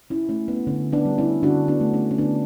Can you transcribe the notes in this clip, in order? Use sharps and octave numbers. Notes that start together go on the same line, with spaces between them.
C#4 E4
A3 C#4
B3
D3 C#4
B3 D4
G3
C#4 E4
D3 D4 F#4
B3 D4
A3
C#4
C#4
D3 B3 D4